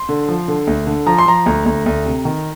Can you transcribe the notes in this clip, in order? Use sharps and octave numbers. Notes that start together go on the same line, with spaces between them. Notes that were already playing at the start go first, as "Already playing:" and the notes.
Already playing: C6
D3
F3
D3
D2
D3
F3 A#5
C6
F3 A#5
D2
D2
D2
C3
D#3